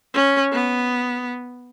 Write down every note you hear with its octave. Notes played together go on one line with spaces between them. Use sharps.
C#4
B3